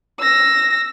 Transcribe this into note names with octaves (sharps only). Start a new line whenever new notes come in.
E6 A#6